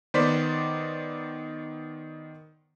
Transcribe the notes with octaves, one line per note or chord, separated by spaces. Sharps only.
D#3 B3 C5 D5 B6